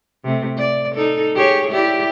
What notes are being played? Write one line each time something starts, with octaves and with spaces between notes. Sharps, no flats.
C3 A3
D5
D#4 A4
G4 G#4 C#5
E4 G4 D5